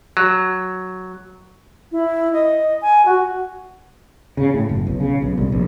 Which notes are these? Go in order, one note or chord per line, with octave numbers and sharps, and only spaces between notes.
F#3
E4
D#5
G#5
F#4
C#3
A2
F#1
B1
C#3
B1
C2
A#1